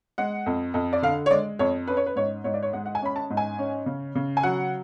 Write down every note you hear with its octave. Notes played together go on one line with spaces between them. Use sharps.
G#3 F#5
F2
F2
D5
D3 F5
C#5
G#3 D5
F2 C#5
C#4 B4
C#5
B4
G#2 C#5
G#2 C#5
D5
C#5
G#3 F#5
F#5
G#5
C#4 B5
A5
G#2
G#5
C#4
C#3
C#3
G#5
F#3 F#5